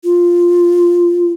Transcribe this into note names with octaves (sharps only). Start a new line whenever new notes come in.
F4